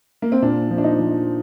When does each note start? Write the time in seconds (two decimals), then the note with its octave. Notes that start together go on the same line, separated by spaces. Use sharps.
0.22 A#3
0.32 C4
0.42 A#2 D4
0.71 F3
0.78 D4
0.84 D#4
0.99 F3